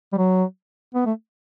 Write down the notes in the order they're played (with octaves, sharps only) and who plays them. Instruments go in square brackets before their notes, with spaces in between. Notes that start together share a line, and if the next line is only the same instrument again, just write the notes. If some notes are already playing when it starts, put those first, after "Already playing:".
[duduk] G3
F#3
B3
A3